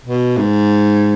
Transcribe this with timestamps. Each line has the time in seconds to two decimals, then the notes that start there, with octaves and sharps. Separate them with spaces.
0.05 B2
0.37 G#2